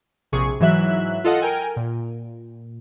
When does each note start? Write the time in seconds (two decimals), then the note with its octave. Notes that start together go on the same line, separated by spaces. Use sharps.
0.32 A#1 C3 G#4 C#6
0.60 G#2 E3 F#3 E5 F#6
1.24 F4 A4 D#5 F#5
1.42 A#4 G5 G#5
1.76 A#2